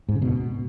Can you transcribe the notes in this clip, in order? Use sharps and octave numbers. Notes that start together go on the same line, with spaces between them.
G#2
C#3
B2